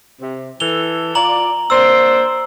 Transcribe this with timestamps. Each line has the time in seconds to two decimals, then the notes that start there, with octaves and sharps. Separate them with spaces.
0.21 C3
0.60 E3 A4 F7 G7
1.15 F4 D5 A#5 F#7
1.70 A#3 D4 C5 E6